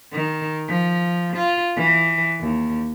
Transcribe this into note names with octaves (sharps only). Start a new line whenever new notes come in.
D#3
F3
F4
E3
D#2